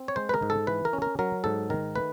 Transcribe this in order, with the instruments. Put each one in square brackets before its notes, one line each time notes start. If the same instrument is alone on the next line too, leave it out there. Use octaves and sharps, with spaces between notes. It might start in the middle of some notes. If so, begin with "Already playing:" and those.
Already playing: [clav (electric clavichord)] C4
C#5
G#3 C5
B4
A#4
G#2
A4
E3 B4
A#4
C#4
A#4
F#3 A#4
G#2 A4
D#3 A#4
A3 B4